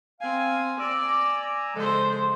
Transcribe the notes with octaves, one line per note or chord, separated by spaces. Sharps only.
C4 F5 G#5
D5 G#5 A#5 D6 E6
C#3 F3 G#3 A4 C5